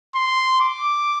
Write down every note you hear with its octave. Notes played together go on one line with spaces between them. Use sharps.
C6
D6